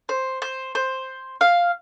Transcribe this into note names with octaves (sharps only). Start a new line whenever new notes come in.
C5
C5
C5
F5